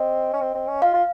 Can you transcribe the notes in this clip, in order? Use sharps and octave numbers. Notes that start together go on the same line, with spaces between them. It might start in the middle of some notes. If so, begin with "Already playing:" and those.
Already playing: C4 D#5
C#4
C4
C4
C#4
F4 F5
F4